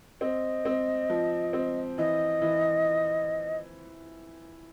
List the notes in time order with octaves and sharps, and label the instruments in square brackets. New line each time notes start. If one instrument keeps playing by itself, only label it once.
[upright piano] C4 [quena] D#5
[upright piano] C4
F3
C4
[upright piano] E3 [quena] D#5
[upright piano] E3